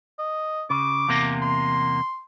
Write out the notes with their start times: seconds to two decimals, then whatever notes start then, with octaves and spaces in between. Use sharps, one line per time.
0.19 D#5
0.70 C#3 D6
1.08 E2 C3 A#3
1.42 C6